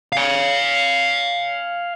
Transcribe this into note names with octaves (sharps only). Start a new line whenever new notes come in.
F5 G#5